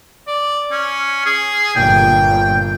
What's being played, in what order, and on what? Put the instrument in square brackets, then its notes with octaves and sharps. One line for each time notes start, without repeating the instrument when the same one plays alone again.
[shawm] D5
C#4
G#4
[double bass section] G1 A#2 [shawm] G5